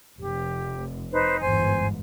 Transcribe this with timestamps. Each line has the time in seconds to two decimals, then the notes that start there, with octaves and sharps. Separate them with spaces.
0.20 F1 G4
1.12 D#4 B4 C5
1.41 G1 E2 G#2 C5 G#5